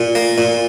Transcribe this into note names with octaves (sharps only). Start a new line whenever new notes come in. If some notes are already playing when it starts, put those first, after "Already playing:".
Already playing: A#2
A#3
A#2